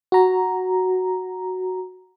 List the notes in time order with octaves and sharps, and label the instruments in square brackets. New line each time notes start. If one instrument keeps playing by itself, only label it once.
[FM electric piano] F#4 A#5